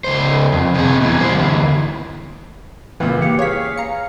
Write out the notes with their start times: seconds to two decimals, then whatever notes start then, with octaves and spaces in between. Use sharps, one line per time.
0.04 C#2 C5
0.52 F2
0.74 C3 G#4
1.01 B2 E3
1.19 G3 C5
1.34 D2 E3
3.00 C#2 A#2 E3
3.22 G4 F5 C#7
3.39 G#4 C#5 F5 B6
3.77 A#5 C#7